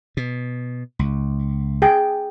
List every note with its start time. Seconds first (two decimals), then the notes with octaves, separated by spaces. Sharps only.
0.17 B2
0.99 C#2
1.82 G#4 G5